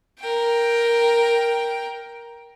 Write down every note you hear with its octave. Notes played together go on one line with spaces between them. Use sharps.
A#4 G5